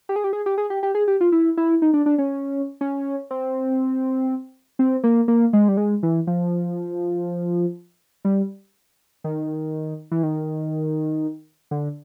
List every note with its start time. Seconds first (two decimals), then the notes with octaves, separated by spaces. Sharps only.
0.09 G4
0.16 G#4
0.24 G4
0.33 G#4
0.46 G4
0.58 G#4
0.70 G4
0.83 G4
0.95 G#4
1.08 G4
1.21 F4
1.32 E4
1.57 E4
1.82 D#4
1.94 D4
2.06 D4
2.18 C#4
2.81 C#4
3.31 C4
4.79 C4
5.04 A#3
5.28 A#3
5.53 G#3
5.68 G3
5.77 G#3
6.03 E3
6.27 F3
8.25 G3
9.24 D#3
10.11 E3
10.23 D#3
11.71 D3